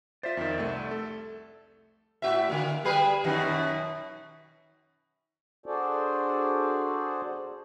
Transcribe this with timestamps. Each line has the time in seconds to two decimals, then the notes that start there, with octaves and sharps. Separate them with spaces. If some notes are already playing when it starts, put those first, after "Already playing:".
0.23 F4 C5 D5 E5
0.37 F2 D#3
0.58 C2 A3
0.91 A4
2.22 A2 F#4 E5
2.50 D3 A#3
2.85 G3 G#4 B4
3.24 F#2 B2 D#3
5.66 D4 F#4 G#4 A4 C5 D5